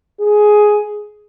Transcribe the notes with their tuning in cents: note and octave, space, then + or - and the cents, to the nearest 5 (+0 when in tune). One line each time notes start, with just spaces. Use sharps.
G#4 +10